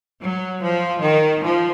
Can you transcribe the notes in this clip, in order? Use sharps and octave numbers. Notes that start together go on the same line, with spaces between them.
F#3
F3
D#3
F3